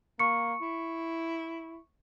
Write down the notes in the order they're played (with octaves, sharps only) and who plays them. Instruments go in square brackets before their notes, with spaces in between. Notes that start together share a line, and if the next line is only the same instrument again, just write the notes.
[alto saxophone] A#3 [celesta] C#6 C#7
[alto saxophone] E4